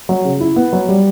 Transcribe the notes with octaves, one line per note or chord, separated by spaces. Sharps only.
F#3
C#3
E4
B3
F#3
G3